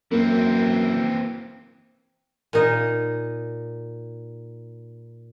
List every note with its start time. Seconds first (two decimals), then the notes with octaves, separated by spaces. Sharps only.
0.11 F#2 E3 A#3 C4
2.53 A#2 D#4